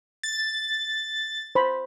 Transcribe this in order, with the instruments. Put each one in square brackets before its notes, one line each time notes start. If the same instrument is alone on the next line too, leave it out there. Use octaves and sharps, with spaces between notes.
[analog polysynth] A6
[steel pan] C5 B5